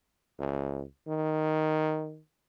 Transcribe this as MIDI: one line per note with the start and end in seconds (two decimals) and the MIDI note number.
0.39 0.83 37
1.08 2.20 51